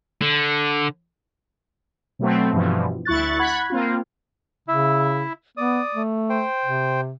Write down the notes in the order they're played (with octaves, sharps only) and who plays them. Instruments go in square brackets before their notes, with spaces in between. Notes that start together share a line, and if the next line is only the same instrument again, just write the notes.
[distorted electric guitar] D3
[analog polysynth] B2 F#3 A3 C4
G2 B2 E3 F3
D2 E4 C#6 F#6 A6
F#5 B5 F#6 G#6
A#3 C4 F4
[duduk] C#3 [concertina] E4 E5
[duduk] B3 [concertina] D5 D#6
[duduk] A3
[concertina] C5 G5
[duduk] C3